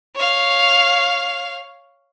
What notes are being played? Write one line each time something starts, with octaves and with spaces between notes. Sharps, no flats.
C#5 F5